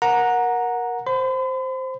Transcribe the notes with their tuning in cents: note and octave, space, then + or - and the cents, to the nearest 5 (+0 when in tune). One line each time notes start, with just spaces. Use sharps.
A#4 +15 F#5 -15 A#5 +0
C5 +0 B5 +45